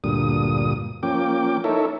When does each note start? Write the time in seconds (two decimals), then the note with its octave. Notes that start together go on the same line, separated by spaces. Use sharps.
0.04 D2 G2 A#2 D#6
1.03 F3 A#3 C#4 G5 D6
1.64 D#4 E4 A4 A#4 C#5 E5